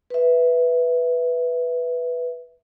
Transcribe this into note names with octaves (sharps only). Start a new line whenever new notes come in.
B4 E5